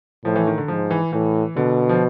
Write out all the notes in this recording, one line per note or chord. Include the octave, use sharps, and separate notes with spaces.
A2 F3
E3
D#3
D3
G#2 F3
E3
A2 E3
B2 D3
F3